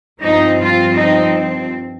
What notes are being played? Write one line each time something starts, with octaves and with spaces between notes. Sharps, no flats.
G2 F3 C4 D#4
F4
D#4